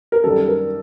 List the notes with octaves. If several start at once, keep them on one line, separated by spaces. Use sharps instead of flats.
A#4
F#2 D#3 G3 A4
A#4